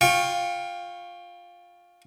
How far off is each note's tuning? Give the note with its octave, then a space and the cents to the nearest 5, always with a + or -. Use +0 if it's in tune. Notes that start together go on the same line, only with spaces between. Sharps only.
F4 +10 G5 +25 C#6 -15